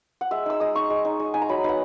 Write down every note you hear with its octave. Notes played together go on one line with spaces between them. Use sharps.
F#5
G#3 E5
D#4 E6
G#3 D#6
D#4 C#6
G#3
D#4
G#3
D#4 G#5
A#5
F#3 B5
B3 D#4 F#5